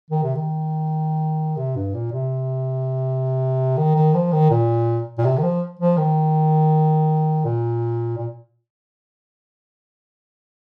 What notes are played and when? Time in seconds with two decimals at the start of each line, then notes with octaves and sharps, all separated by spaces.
0.10 D#3
0.23 C3
0.35 D#3
1.57 C3
1.76 G2
1.95 A#2
2.12 C3
3.77 D#3
3.96 D#3
4.14 F3
4.32 D#3
4.51 A#2
5.18 A#2
5.25 C3
5.38 D#3
5.43 F3
5.79 F3
5.97 D#3
7.45 A#2
8.17 A#2